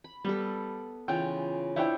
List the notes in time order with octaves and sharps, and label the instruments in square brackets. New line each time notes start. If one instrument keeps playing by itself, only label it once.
[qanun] B5
[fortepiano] G3 [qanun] B3 A4
[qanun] C#3 E3 F4 [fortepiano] G5
[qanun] D4 C5 C#5 [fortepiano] E4 G5